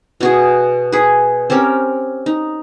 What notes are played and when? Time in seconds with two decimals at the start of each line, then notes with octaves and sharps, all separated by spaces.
0.21 B2 F#4 G#4
0.92 G#4 B4
1.50 C4 C#4 G4 A#4
2.26 D#4